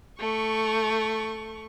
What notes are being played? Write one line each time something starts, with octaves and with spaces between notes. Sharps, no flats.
A3 C#6